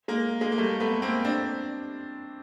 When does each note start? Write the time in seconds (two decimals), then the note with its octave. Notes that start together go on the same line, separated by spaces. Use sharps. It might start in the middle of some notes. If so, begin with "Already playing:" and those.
0.08 G#3 A#3
0.41 G#3 A#3
0.52 A#3
0.58 G3 A3
0.80 A3 B3
1.02 A#3 C4
1.25 C4 D4